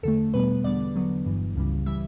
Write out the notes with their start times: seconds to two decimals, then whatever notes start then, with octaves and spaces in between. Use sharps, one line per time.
0.03 E2 D3 A3 A4
0.34 E2 B2 G3 B3 B4
0.64 E2 D3 G3 B3 D5
0.95 E2 D3 F#3 B3
1.25 G1 G2 E3
1.55 C#2 C#3 E3 G3
1.86 E3 G3 E5